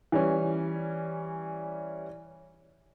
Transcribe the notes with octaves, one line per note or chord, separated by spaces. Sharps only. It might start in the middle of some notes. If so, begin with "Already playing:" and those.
E3 G3 C#4